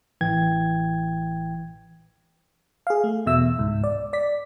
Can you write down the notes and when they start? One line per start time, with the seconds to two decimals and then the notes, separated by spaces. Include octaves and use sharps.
0.21 A1 E3 G5 G#6
2.87 G#4 F5
3.04 A3
3.26 E2 B2 E5 E6
3.58 C#2 G#2
3.84 D5
4.13 D5 B6